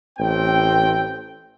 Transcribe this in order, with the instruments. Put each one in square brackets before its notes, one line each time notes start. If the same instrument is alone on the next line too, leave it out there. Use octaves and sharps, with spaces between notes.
[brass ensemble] A1 C4 G5